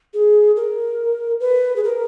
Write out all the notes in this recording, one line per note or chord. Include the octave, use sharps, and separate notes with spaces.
G#4
A#4
B4
G#4
A#4